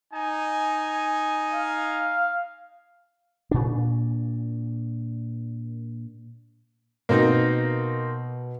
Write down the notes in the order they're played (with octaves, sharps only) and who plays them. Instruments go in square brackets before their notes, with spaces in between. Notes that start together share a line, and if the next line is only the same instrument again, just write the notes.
[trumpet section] D#4 G#5
[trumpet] F5
[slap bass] A#2 D4
[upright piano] B2 [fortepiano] A#3 C4 D#4